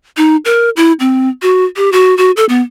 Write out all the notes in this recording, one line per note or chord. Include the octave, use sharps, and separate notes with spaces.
D#4
A#4
E4
C4
F#4
G4
F#4
F#4
A4
B3